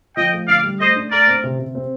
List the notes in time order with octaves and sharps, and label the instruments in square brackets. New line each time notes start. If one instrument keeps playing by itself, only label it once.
[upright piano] F3 [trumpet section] D#5 G5
[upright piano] A3
[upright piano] D3 [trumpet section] D5 F5
[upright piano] G3
[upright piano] A3 [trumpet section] C5 D#5
[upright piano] D4
[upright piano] A3 [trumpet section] A#4 D5
[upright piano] C4
C3
C3
C4